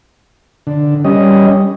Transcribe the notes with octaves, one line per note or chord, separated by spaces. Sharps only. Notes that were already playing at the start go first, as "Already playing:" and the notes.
D3
G3 C#4 D#5